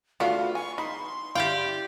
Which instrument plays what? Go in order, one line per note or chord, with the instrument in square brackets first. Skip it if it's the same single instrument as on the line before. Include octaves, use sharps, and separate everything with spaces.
[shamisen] A3 D4 [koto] B3 [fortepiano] F4 F5 [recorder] F#4
[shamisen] G#5 [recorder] C#6
[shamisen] D#4 [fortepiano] B5 [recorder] C6
[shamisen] E4 [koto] G4 D5 G5 [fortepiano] F5